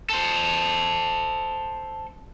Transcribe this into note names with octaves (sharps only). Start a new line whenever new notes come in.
A4 C5